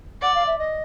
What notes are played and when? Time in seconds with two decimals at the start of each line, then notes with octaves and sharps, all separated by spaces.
0.21 D5 F#5
0.34 F5
0.46 E5
0.58 D#5